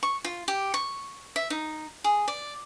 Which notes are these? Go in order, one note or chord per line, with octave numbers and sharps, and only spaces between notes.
C#6
F4
G4
C#6
E5
D#4
G#4
D5